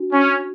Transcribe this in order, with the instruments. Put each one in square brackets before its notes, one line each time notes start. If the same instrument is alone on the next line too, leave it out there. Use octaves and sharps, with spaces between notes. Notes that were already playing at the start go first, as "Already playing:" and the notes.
Already playing: [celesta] D4 F#4
[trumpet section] C#4